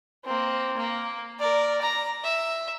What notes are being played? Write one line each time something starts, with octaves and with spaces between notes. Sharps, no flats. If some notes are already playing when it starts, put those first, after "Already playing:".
A#3 C4
A#3
A#4 D5
A#5
E5